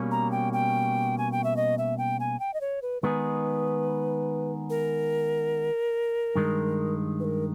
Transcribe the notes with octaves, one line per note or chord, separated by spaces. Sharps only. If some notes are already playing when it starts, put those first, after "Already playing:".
Already playing: B2 G3 A#3 C#4
A#5
G5
G5
G#5
G5
E5
D#5
E5
G5
G#5
G5
D#5
C#5
B4
D#3 G#3 B3 D#4 G#4 B4
A#4
G2 D#3 G#3
B4
A#4